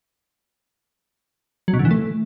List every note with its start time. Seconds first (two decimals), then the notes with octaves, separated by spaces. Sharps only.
1.68 F#3
1.74 B2
1.79 D3
1.85 E3
1.91 A3